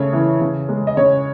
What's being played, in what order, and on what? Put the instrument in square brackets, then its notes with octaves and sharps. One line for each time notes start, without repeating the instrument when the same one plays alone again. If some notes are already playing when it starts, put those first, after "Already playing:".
Already playing: [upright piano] C#3 A3 C#5
E3
C#3
G#3
D#5
C#3 C#5